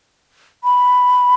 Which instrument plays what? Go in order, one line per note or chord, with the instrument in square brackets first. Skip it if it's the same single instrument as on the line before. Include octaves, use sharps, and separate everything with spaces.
[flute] B5